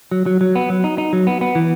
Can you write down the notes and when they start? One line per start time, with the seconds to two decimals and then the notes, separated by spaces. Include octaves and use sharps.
0.11 F#3
0.26 F#3
0.41 F#3
0.55 B3
0.70 F#3
0.84 D#4
0.98 D#4
1.13 F#3
1.27 B3
1.41 B3
1.55 E3